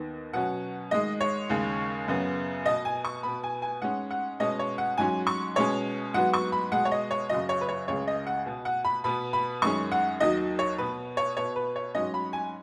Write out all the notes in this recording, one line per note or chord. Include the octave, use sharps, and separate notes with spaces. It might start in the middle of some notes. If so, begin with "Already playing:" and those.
Already playing: D#2 D#3 B3
B2 F#3 C#4 F#5
G#2 D#3 G#3 D#5
C#5
D#2 C#3 G#3
F#2 C#3 B3
B2 B3 D#5
G#5
C#6
B2 B3 B5
G#5
G#5
G#2 G#3 C#4 F#5
F#5
B2 G#3 C#4 D#5
C#5
F#5
G#2 F#3 C#4 G#5
C#6
B2 G#3 C#4 C#5
G#2 F#3 B3 F#5
C#6
B5
B2 G#3 B3 F#5
C#5
D#5
C#5
F#2 C#3 F#3 D#5
C#5
B4
C#5
C#2 C#3 G#3 C#5
D#5
F#5
B2 B3
F#5
B5
B2 B3 B5
B5
F#2 D#3 G#3 C#4 C#6
F#5
D#2 D#3 F#3 D#5
C#5
B2 B3 B4
C#5
B2 B3 C#5
B4
C#5
G#2 F#3 C#4 D#5
B5
G#5